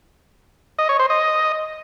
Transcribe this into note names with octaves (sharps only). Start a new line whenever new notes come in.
D#5
C#5
C5
D#5